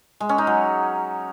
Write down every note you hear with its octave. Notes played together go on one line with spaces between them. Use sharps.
G#3
C#4
D#4
F#3